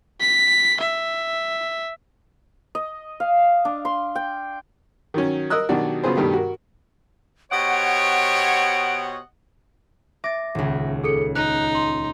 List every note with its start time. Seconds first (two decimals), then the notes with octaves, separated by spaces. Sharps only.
0.20 B6
0.80 E5
2.75 D#5
3.20 F5
3.65 D4
3.85 C6
4.15 G5
5.14 D#3 F#3 C#4
5.50 A#4 D#5 D#6 E6 F#6
5.69 B2 D#3 F#3 D4 F#4 G4
6.04 C#3 F#3 B3 F4 G#4 C5
6.17 G2 B2 D#3 A3 G4
6.33 F#4 A#4
7.51 B2 G4 C5 C#5 D#5 F#5 D7
10.24 E5 D6 A6 A#6
10.55 D#1 C#2
11.04 G#4 A4 C#7
11.36 D#4 F#6
11.75 C6